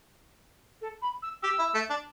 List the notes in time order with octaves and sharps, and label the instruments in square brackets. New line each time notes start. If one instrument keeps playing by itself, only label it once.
[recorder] A4
B5
E6
[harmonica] G4 [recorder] E6
[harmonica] E4
A3
D4